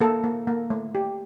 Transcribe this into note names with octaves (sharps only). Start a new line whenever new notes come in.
A#3 A4
A#3
A#3
A3
G4